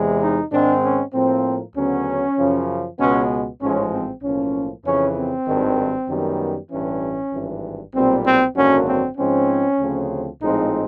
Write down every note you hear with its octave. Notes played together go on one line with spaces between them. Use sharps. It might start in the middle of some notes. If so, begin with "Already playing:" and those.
Already playing: E2 C3 E3 G#3
D#4
G#2 D#3 G#3 C4 D4
C#4
A2 F3 A#3 C4
D2 C#3 F#3 B3 C#4
F#2 C#3 F3
C#2 B2 G#3 B3 C#4
A1 G#2 F3 G#3 C#4
C4
B1 A2 F3 A#3 C#4
F2 C#3 E3 C#4
C4
G#1 G2 D#3
F#2 D#3 G3 B3
A1 G2 E3 C#4
G#1 G2 E3
B1 A#2 G3 C4
C4
G#1 F#2 D3 F#3 A#3 C#4
C4
G#2 F3 G#3 C4 C#4
D2 C#3 F3 A3 C4
A#1 A2 F3 G#3 C4 D#4